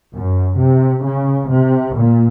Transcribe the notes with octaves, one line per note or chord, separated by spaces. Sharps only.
F#2
C3
C#3
C3
A#2